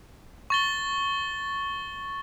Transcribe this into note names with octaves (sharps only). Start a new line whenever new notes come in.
C#6 A6 G7